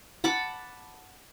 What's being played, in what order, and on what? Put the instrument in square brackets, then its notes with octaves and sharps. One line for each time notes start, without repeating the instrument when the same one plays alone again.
[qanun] F#5 A5 B5 D6